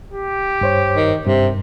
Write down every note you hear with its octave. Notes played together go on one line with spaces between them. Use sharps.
G4
G2 C5 C#5
D#3
G2 C3